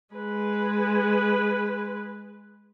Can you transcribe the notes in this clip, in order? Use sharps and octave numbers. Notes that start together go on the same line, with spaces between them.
G#3 B4